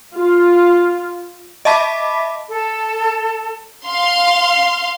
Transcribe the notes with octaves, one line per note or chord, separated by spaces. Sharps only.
F4
D#5 E5 A5 B5 D6 B6
A4
F5 C6